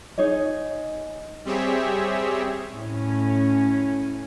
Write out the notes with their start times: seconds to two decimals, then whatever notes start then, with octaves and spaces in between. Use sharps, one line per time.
0.18 D#4 G#4 C#5 D#5
1.45 G3 C4 G4 G#4 C#5 E5
2.70 A2 C#4